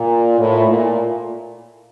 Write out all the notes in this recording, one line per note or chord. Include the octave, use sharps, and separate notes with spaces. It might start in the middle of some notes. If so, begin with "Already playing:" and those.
Already playing: A#2
A2
A#2